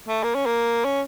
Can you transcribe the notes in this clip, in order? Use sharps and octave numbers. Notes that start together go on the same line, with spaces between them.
A3
A#3
C#4
A#3
C#4